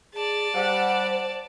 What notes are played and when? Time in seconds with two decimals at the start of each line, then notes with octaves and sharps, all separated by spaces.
0.14 G#4 D5 A5
0.54 G3 C5 F#5